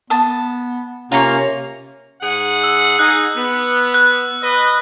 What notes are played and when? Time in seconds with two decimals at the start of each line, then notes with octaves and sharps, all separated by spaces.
0.10 B3 A5 D#6
1.12 C3 A#3 C#4 F4 C#5 A#5
2.21 G#2 G#4 F#5
2.64 E6
2.99 D#4 G#4 F#6
3.36 B3
3.94 F#6
4.42 B4 D#5